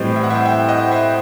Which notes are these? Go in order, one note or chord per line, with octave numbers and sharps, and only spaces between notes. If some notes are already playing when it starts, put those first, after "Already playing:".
Already playing: A2 E3 G3 C4 D#5
E5
F#5
C5 E5
E5 G5
D#5 F#5
C5 E5